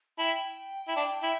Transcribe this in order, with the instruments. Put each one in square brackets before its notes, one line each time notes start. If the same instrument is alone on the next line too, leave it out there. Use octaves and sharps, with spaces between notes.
[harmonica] E4 [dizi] G5 A5
[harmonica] E4
D4
E4